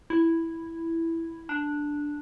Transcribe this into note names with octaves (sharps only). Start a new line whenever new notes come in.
E4
D4